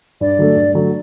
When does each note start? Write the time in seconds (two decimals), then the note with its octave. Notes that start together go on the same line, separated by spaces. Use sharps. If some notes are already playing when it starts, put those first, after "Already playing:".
0.21 G2 D5
0.39 D3 F#3 A3
0.56 G2
0.74 D3 F#3 A3